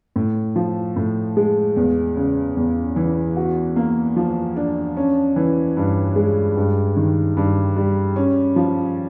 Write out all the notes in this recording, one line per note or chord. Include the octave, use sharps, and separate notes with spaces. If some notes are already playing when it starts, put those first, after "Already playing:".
A2
F3
A2
G#3
E2
C#3
E2
E3
F#4
A#3
F3
D4
C#4
E3
G2
G#3
G2
D#3
G2
G3
C#4
F3